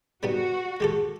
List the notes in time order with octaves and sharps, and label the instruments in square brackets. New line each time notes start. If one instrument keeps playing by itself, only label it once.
[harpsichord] G3 B3 D#4 [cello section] F#4
[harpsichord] G#3 G4 A4